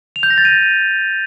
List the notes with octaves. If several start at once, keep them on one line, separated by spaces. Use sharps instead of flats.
F7
G6
A#6
A6
D#7